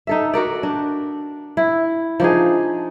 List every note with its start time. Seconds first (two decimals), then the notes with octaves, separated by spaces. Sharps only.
0.07 D#4 A4 E5
0.34 F#4 A#4 D5
0.63 D4
1.57 E4
2.20 F3 D4 D#4 G#4